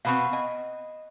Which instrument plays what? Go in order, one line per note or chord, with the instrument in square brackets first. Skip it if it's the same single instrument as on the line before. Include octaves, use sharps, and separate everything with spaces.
[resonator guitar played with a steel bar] B2 B3 C4 [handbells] F5 B5 C#6
[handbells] D#5 [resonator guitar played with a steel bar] G#5